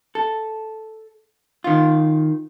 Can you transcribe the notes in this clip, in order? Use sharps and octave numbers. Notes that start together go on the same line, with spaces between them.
A4
D#3 F4